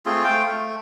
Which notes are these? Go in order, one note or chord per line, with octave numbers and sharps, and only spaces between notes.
A3 C4 F4 G#4
A3 C5 F5 G5
A3